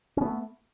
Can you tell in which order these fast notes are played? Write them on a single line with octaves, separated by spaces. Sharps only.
C#4 B3 A3